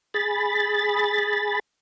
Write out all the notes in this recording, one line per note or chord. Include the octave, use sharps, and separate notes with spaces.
G#4 B5 A6